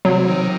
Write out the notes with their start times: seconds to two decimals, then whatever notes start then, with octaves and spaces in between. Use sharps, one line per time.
0.05 C3 F#3
0.28 D#3